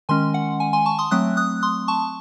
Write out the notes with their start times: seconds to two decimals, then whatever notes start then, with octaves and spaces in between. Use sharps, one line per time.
0.09 D#3 G#3 C#4 G#5 C6
0.34 F#5
0.60 G#5
0.73 G#5 C6
0.86 A5 C#6
0.99 C6 D#6
1.11 F#3 A3 C4 D#6 F#6
1.37 D#6 F#6
1.63 C6 D#6
1.88 A5 C#6